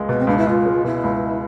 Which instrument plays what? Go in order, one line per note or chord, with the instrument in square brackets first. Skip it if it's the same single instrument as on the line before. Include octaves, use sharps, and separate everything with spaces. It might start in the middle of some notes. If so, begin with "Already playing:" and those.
Already playing: [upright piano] C#2 G#3
[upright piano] B2 [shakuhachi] B3
[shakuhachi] C4
[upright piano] C#2 [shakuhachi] D4
[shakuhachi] E4
[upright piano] C#2 [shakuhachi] F4
[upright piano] G#3
[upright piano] B2 [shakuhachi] E4
[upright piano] C#2